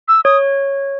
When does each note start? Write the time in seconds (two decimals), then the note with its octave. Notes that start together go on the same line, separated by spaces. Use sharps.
0.08 E6
0.25 C#5 D#6